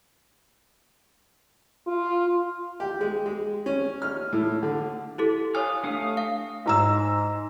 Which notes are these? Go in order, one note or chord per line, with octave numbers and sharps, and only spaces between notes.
F4
G4
G#3
G#3
C#4
F6
A2
D3
E4 G4 A4
C#5 F5 G#5 D#6 F6
A3 D4 F5 D#6
F5
G#2 A#5 E6